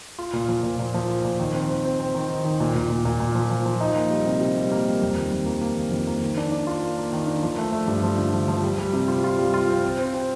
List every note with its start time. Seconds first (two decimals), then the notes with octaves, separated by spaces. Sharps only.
0.19 F4
0.33 A#2
0.48 F3
0.63 A#2
0.79 A#2
0.94 F3
1.08 F4
1.24 A#2
1.39 D#3
1.54 C4
1.69 C4
1.85 C4
2.00 C4
2.14 D#3
2.29 D#3
2.44 D#3
2.60 A#2
2.75 A#2
2.90 A#2
3.05 A#2
3.20 A#2
3.35 F3
3.50 F3
3.66 F3
3.81 D#4
3.95 A#3
4.10 G3
4.26 C3
4.41 C3
4.56 G3
4.71 A#3
4.86 G3
5.01 F2
5.16 D#3
5.32 F2
5.46 A#3
5.61 A#3
5.77 D#3
5.91 F2
6.07 A#3
6.22 D#3
6.37 D4
6.52 D4
6.67 F4
6.82 A#3
6.98 A#3
7.13 D#3
7.27 D4
7.43 F3
7.58 A3
7.72 A3
7.88 G2
8.03 F3
8.18 D3
8.33 F3
8.48 F3
8.63 G3
8.78 G3
8.93 C3
9.08 F4
9.24 F4
9.39 G3
9.54 F4
9.69 C4
9.84 C4
9.98 C4
10.14 C4